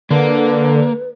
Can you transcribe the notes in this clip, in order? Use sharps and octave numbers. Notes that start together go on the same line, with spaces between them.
D3 A#3 B4